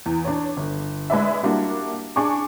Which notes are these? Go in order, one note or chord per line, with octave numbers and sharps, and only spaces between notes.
E2
D4 C#5
G1
G#3 B4 D5 E5
G3 A#3 D4 E4 F#4
D4 G#4 C#6 D6